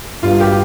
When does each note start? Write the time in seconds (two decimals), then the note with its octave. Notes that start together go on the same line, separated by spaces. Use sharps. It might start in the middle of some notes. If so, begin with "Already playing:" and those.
0.23 G2 F4
0.40 G4